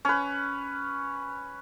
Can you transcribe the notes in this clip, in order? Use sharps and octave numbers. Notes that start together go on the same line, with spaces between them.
C#4 B4